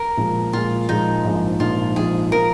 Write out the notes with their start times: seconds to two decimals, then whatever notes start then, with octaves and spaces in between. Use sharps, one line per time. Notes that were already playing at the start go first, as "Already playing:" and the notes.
Already playing: A#4
0.17 A#2 F3 G#3
0.53 A#2 F3 G#3 F4
0.89 A#2 F3 G#3 D#4
1.25 A#1 G#2 F3
1.60 A#1 G#2 F3 F4
1.96 A#1 G#2 F3 G#4
2.32 F3 A#4